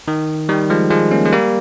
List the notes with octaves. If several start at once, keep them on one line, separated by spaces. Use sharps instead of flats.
D#3
D#3 G3
F3 G#3
F3 G#3
A#3 C#4
G#3
G3 A#3